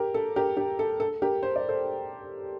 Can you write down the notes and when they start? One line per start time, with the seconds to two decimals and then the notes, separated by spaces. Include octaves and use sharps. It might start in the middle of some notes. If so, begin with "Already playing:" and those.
Already playing: G4 A#4
0.14 A4
0.36 G4 A#4
0.57 G4
0.79 A4
1.00 A4
1.22 G4 A#4
1.43 C5
1.56 D5
1.69 A4 C5